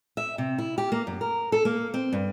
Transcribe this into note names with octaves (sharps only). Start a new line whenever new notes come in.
E5
C3
E4
G4
A#3
F#2
A#4
A4
A#3
C4
G2